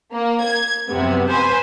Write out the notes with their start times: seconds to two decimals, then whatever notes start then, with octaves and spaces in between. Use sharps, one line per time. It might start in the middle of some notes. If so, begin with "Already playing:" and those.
0.14 A#3
0.43 G#6
0.89 F#2 C3 B3
1.29 B4 C5 G#5